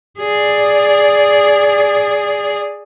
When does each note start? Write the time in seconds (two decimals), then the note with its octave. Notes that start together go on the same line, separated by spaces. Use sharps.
0.19 G#4 D5